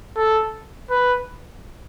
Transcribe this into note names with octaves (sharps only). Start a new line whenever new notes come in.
A4
B4